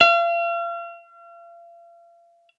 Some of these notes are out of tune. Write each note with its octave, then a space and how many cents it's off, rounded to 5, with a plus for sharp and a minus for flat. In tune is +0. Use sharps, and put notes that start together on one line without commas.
F5 -40